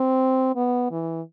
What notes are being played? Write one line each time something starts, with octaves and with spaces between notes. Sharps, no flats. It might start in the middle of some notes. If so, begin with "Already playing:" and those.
Already playing: C4
B3
E3